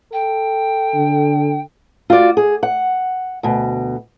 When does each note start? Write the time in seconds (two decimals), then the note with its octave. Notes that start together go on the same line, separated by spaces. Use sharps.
0.13 A4 G5
0.95 D3
2.10 F4 F#4 D5
2.37 G#4
2.63 F#5
3.43 D2 B2